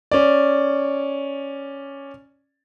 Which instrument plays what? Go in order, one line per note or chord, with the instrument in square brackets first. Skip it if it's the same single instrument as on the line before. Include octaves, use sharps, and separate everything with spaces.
[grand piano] C#4 D5